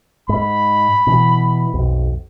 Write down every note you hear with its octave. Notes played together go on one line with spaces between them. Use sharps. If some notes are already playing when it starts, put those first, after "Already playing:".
G#2 B5
B2 E3
B1 F2